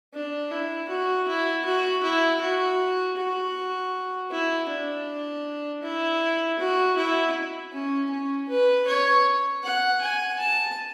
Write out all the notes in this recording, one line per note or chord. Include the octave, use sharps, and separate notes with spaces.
D4
E4
F#4
E4
F#4
E4
F#4
F#4
E4
D4
E4
F#4
E4
C#4
C#4
B4
C#5
F#5
G#5
A5